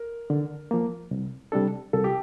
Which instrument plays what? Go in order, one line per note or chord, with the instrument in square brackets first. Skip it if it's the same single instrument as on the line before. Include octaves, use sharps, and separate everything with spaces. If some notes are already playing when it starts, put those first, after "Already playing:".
Already playing: [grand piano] A#4
[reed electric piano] D3
F3 A#3
C2
C3 G3 D4 A4
[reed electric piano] C2 [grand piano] A4
[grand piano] G4